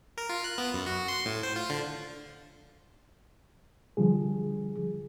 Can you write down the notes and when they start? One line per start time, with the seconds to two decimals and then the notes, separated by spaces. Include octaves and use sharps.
0.18 A#4
0.29 F4
0.44 F#6
0.58 B3
0.73 F#2
0.86 F#4
1.08 C6
1.26 A2
1.43 C5
1.56 F4
1.69 D3
3.97 D3 F3 G3 G#4